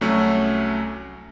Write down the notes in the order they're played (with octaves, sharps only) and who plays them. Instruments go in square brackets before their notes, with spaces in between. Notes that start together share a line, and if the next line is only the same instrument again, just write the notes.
[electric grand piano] C2 F#3 A3 C#4 E6